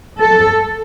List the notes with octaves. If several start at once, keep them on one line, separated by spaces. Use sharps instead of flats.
A4